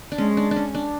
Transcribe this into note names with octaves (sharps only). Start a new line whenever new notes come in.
D4
G#3 C#4
D4
D4
C#4
D4